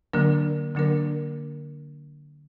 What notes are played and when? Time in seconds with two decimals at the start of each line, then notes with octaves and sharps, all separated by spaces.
0.13 D3 F#3 A#3 D4 A#4
0.75 D3 F#3 A#3 D4 A#4